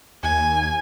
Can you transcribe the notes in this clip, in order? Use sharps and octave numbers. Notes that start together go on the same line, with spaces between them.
D#2 G#5